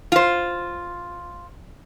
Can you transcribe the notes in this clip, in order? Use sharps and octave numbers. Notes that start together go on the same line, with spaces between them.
F4 C5